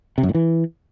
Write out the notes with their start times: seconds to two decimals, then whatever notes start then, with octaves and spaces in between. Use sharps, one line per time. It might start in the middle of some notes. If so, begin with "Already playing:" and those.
0.18 C3
0.23 F#2
0.29 A2
0.35 E3